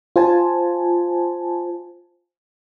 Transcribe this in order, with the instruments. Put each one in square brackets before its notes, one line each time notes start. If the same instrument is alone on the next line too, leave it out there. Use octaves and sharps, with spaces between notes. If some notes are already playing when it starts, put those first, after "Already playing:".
[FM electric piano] F4 C5 G#5 A5